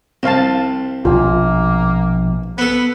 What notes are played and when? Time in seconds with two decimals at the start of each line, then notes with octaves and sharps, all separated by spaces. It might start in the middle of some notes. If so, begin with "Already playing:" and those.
0.23 C2 C4 F5 A5
1.05 A#1 B2 A#3 F4
2.58 B3 A4 B4